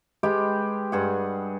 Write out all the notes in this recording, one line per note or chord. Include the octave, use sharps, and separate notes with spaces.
G#3 G4 B4 G5
G2 G#4 F#5